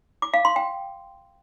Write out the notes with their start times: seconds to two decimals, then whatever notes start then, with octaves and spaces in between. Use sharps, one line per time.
0.22 D6
0.34 F5
0.45 C6
0.56 G5